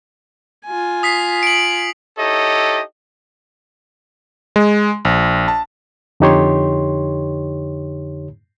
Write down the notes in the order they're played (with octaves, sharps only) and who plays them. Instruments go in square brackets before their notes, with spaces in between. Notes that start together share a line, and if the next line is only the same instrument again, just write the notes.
[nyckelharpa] F4 G#5
[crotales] D#6 B6 C7
D7 F#7
[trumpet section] D#4 E4 G4 A4 C#5 D#5
[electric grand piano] G#3
A#1
A5
[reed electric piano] F2 D3 D#4 G4 C#5 C6